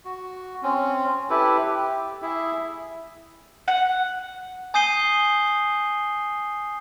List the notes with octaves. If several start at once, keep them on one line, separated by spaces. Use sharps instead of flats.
F#4
C4 C#4
E4 G4 A4 B4
G4
E4 G#4 E5
F#5
G#5 D#6 G6 C7 D#7 G7